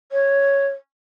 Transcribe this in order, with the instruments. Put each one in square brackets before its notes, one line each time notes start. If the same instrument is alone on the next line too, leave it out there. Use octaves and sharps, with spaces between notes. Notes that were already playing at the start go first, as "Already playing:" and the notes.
[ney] C#5